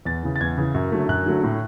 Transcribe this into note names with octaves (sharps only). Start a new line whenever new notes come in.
E2 A6
C#3 E3
A6
E2 G#6
C#3 E3
F#2
D3 F#3 A3
F#2 F#6
D3 F#3 A3
A2